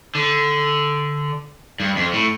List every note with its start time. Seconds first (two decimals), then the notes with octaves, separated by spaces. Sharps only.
0.15 D3
1.80 G2
1.96 F2
2.13 A2